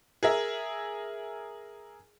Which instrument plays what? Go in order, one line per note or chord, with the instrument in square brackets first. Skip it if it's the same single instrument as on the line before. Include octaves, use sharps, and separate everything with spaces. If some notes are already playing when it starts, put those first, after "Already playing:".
[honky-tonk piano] G#4 A#4 E5